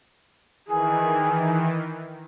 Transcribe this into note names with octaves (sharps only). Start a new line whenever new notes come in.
D#3 E3 G#4